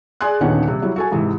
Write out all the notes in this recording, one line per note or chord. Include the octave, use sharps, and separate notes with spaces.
G#4 D5 G#5 C6 F#6
D#1 D3 D#3 B3 C#4 F#5
C3 G3
F#3 G3 E4
F#4 A4 G#5
G#2 C3 E3